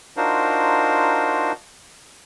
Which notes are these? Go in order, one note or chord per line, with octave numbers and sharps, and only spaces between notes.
D4 D#4 F4 F#4 A#4 C5